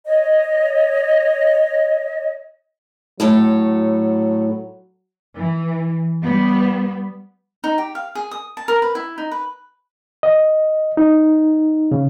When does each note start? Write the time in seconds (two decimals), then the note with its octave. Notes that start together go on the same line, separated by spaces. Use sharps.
0.05 C#5 D#5
3.20 A2 F#3 A4 C#5
5.38 E3
6.22 G3 B3
7.64 D#4
7.78 G4
7.95 F5
8.15 G#4
8.31 D#6
8.57 A5
8.68 A#4
8.82 B4
8.95 E4
9.18 D#4
9.32 B4
10.23 D#5
10.97 D#4
11.92 C#3